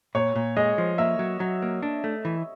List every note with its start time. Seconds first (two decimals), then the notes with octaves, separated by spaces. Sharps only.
0.15 A#2 C#5
0.36 A#2
0.57 G#3 D#5
0.78 F3
0.98 A#3 E5
1.19 F#3
1.40 F#3
1.62 A#3
1.83 D4
2.04 A3
2.25 E3